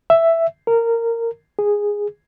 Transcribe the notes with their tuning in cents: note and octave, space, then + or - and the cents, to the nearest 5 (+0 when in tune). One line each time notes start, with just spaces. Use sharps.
E5 +5
A#4 -15
G#4 -10